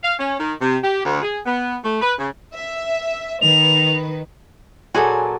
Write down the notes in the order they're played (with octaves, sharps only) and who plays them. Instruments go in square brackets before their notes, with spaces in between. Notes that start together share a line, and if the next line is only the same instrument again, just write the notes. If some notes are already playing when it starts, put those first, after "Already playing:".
[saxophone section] F5
C#4
D#3
C3
G4
D2
G#4
B3
A3
B4
C#3
[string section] E5
[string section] D#3 B4 [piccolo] F7
[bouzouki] A#2 F#3 G#5 [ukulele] F#4 G#4 A4